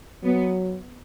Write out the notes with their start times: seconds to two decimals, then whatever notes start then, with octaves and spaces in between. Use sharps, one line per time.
0.24 F#3 B3